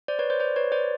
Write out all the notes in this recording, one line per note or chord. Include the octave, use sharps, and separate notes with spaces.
C5 D5
B4 C#5
C5 D5
C5 D5
B4 C#5
C5 D5